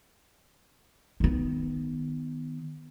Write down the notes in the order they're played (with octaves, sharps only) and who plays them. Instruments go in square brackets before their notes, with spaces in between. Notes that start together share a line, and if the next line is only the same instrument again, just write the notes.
[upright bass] D#3 B3